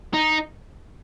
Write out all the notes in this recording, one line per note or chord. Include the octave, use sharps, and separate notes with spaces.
D#4